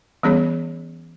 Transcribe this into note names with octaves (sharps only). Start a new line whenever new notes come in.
E3 G3 B3 C#4 G#4 C#5